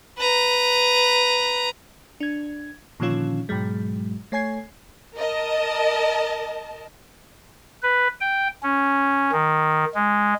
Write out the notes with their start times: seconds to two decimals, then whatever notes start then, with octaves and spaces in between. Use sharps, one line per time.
0.18 B4 A#5
2.20 D4 G#6
3.00 A#2 D3 D#3 F3 C#4 F4
3.49 G#2 B2 F#3 G#3
4.32 A3 C#5 G#5 G#6 C7
5.16 A#4 D#5 A5
7.83 B4
8.21 G5
8.63 C#4
9.32 D#3
9.94 G#3